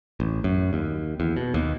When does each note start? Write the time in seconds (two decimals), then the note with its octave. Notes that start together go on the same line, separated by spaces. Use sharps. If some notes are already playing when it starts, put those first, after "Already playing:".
0.20 A1
0.44 F#2
0.73 D#2
1.20 E2
1.37 B2
1.54 D#2